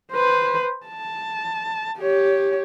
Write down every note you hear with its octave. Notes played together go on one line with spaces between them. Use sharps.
B4 C5
A5
G4 C#5